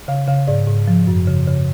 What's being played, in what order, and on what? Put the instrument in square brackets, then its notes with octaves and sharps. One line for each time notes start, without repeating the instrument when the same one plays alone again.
[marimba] C#3 F5
C#3 F5
G#2 D5
G#2
F3
F#2
C#3
C#3